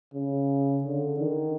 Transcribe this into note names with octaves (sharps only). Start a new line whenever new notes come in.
C#3
D3
D#3